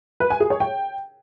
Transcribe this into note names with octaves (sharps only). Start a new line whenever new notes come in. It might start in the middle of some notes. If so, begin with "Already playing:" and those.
B4
G#5
G#4
C#5
G5